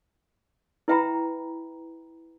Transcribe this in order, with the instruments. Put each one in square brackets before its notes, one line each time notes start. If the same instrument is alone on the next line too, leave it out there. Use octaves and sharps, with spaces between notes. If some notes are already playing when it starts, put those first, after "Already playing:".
[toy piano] E4 B4 E5 G5 A#5 B5